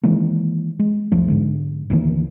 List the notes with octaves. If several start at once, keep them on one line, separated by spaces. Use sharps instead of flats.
D#3 E3 G#3 A#3
G#3
E1 B1 F3 A3
G#2 D3 G#3
D2 D#3 E3 A#3